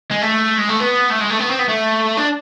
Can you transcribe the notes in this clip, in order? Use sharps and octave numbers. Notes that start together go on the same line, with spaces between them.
G#3
A3
G#3
A3
B3
A3
G#3
A3
B3
C4
B3
A3
D4